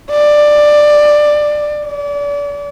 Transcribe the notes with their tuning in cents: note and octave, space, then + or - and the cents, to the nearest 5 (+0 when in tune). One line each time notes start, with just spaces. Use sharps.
D5 +15
D5 -35